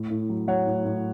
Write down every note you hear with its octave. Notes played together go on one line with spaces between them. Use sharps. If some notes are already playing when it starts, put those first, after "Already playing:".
Already playing: A2
A2
F#3
F#3 C#5 F#5
A2
A2